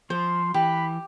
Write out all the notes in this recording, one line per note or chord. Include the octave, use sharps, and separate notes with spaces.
F3 C5 C6
E3 G4 B5